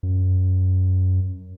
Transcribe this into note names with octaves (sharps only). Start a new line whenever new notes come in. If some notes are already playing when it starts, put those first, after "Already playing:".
F#2